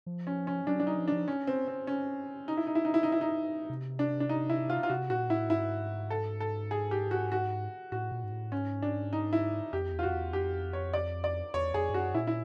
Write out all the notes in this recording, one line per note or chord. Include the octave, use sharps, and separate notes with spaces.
F3
C#4
C#4
F#3 D4
D4
F#3 D#4
F3
F3 D4
C#4
C4
C4
C#4
D#4
E4
D#4
E4
D#4
E4
D#4
E4
D#4
C3
D4
D4
D#4
E4
F4
F4
C3 F#4
A#2 F#4
A2 E4
G#2 E4
A4
A4
G#4
G4
F#4
F#4
A2 F#4
A#2
G#2
A2
G#2 C#4
D4
D#4
E4
F2 G4
E2
F4
F2 F#4
E2
F2 G4
C#5
D5
D5
E2 C#5
F2 G#4
G2
F#2 F#4
A#2 E4
E4